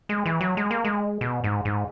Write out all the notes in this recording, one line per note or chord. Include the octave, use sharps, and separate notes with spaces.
G#3
E3
F#3
G#3
A#3
G#3
B2
G#2
G#2